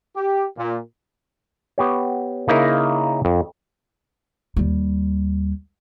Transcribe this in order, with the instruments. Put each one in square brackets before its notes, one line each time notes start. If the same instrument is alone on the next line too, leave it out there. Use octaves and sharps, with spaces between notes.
[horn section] G4
A#2
[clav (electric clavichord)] B3 G4 C#5
C#3 A#3 D#4 E4 A#4
F2
[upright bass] D#2 G3